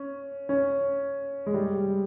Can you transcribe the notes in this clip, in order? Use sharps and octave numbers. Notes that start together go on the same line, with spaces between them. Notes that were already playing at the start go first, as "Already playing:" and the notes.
Already playing: C#4
C#4
G#3
G3